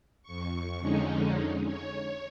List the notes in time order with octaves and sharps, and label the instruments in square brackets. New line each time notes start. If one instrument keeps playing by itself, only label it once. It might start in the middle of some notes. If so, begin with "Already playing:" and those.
[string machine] F2 C#6
F2 D3 G#3 C#4 D#4
C#5